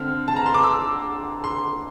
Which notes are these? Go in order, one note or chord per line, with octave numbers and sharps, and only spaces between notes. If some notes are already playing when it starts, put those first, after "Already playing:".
Already playing: D3 A3 C4 F6
A5
A#5
C6
D6
E6
C6